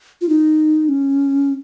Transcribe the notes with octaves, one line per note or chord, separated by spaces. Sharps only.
F4
D#4
C#4